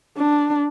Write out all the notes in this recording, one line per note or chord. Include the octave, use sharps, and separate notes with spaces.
D4